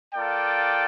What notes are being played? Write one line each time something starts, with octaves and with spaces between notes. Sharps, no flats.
A#3 F4 A4 D5 G5